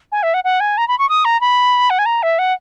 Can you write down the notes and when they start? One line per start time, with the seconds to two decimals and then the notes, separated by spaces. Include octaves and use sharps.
0.12 G#5
0.23 E5
0.34 F#5
0.44 F#5
0.60 G#5
0.77 A#5
0.88 B5
0.99 C#6
1.09 D#6
1.25 A#5
1.41 B5
1.90 F#5
1.99 G#5
2.06 A#5
2.23 E5
2.39 F#5